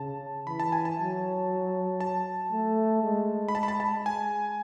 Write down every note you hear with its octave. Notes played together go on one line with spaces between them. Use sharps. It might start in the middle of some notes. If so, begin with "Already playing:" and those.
Already playing: C#3 A5
E3 B5
A5
G#5
A5
F#3
A5
A3
G#3
B5
A5
B5
A5
A5
G#5